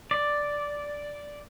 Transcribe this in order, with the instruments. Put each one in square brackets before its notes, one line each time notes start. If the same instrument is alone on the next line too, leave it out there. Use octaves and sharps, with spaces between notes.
[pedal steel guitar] D5